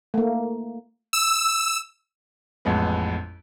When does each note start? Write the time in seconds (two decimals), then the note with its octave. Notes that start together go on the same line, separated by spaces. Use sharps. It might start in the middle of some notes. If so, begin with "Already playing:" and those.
0.14 A3 A#3
1.13 E6
2.65 A1 F2 G#3 B3